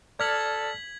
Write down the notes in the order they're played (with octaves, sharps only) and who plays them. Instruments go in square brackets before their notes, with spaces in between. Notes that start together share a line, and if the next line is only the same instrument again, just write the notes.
[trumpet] A4 [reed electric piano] D5 F6 [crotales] G#6 B6 F#7